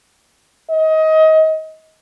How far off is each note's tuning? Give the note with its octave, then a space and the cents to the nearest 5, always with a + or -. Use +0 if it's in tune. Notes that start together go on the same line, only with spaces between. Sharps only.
D#5 +25